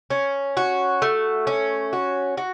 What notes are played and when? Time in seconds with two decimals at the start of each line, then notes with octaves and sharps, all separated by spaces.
0.10 C#4
0.57 F#4
1.02 A3
1.47 C#4
1.93 F#4
2.37 F#4